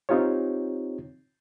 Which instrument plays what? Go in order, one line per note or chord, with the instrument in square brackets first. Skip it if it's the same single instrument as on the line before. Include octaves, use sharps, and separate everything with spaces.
[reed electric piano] C4 D#4 F4 G4 C#5